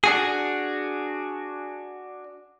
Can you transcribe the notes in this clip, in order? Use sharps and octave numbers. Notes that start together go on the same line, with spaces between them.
D4 F#4 G#4